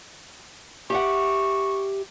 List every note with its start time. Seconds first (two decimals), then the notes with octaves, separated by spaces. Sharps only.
0.90 G4 E5 F#5 C#6